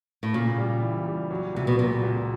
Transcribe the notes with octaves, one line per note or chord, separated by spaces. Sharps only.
A2
A#2 C#3
G3
E3
G3
F#3
C#2 C3
B2
A#2 F#3
C#2